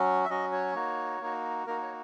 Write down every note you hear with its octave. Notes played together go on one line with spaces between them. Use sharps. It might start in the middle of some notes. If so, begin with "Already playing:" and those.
Already playing: F#3 C#4 F#4
E5
F#3 C#4 F#4 D#5
C#5
A#3 D#4 F#4
A#3 D#4 F#4
A#3 D#4 F#4 A#4
C#5